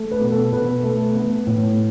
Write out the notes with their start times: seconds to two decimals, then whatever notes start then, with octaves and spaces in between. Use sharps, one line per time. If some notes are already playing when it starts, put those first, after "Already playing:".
Already playing: A3
0.11 B4
0.21 B2
0.32 A4
0.53 B2 B4
0.83 A3
1.15 B3
1.47 A2